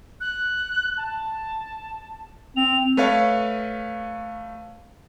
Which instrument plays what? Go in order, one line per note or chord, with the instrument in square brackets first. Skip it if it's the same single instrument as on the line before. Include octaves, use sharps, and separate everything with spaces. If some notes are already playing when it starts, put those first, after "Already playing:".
[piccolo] F#6
A5
[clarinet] C4 [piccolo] F7
[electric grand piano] A3 B4 C#5 F5